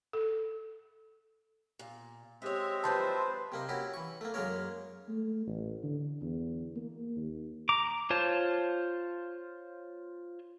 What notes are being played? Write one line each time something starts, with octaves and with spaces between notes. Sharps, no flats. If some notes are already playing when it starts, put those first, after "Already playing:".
A4
A#2
G#3 C4 G4 C#5 E5
D#3 F3 F#3 B4 C5 A5 C6 G6
C3 A#3 D#4
C#4 E4 F#4 G4
E3 C#6
A3 A#3
F#2 G#3 A#3 A#4 C#5
A3
A1
D3
E2
A#3
D#2
A#5 D6
F4 C5 C#5 A5